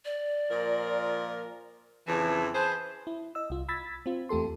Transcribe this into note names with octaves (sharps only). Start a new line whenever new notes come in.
D5
A#2 F3 A#4
F2 C#3 E3 A5
G#4 B4 C5 A5
E4
D#5 E6
C2 F4
B5 E6 G#6 A6 B6
C4 F4
E2 A3 G4 A4 C6